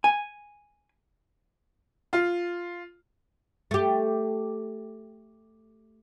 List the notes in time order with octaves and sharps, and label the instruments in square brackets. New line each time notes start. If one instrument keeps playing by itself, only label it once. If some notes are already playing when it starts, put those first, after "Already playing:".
[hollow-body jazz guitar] G#5
[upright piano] F4
[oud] A3 G4